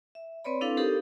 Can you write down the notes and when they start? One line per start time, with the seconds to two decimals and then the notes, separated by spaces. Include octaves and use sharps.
0.15 E5
0.44 C4 B4 C#5 D5 B5
0.61 C4 D4 E4 A4 B4 F5
0.77 D#4 G4 A4 A#4 C5